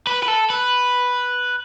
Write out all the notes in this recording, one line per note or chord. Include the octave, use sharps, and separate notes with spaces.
B4
B4
A4
B4